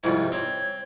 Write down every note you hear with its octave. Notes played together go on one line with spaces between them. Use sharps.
C2 F2 G#2 E4
C4 C#5